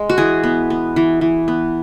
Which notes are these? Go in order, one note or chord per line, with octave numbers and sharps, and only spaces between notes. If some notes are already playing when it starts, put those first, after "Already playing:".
Already playing: G#3
F#4
E3 G#4
B3
B3
E3
E3
B3